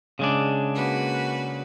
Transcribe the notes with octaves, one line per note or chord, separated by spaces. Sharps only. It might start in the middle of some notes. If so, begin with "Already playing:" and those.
C#3 G#3 D4
A#3 F#4 B4